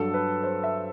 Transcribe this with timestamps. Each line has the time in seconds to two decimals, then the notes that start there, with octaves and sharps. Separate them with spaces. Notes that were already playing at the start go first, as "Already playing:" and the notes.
Already playing: G2 F#3 A4
0.14 B4
0.43 C5
0.64 E5